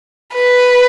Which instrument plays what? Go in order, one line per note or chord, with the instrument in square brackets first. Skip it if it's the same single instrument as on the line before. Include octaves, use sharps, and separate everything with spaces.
[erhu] B4